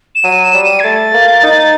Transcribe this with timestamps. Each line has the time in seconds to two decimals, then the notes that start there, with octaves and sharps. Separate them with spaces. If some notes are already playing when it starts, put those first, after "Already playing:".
0.15 E7
0.24 F#3 D#7
0.44 E7
0.54 G3
0.64 D#7
0.80 G#6
0.84 A3 A6
1.14 A#3
1.43 D#4